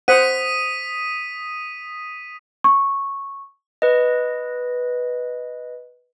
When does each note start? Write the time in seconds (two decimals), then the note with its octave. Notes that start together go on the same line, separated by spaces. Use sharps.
0.08 C5 F#5 D#6 B6 D#7
2.64 C#6
3.82 B4 D#5